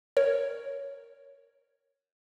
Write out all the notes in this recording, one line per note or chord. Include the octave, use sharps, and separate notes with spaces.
A#4 C#5